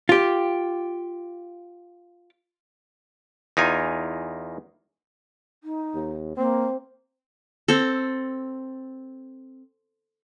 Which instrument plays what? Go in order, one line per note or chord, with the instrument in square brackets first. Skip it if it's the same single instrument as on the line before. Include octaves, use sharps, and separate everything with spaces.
[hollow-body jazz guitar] F4 G4
[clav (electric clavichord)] E2 D#4 F4 G#5
[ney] D#4
[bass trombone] D#2
[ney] A#3 [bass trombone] C4
[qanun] C4 A4